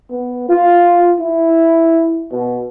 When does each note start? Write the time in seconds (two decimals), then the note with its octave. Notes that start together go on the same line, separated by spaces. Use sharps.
0.10 B3
0.49 F4
1.19 E4
2.32 B2